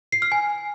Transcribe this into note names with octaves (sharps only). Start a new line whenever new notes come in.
C7
F6
G#5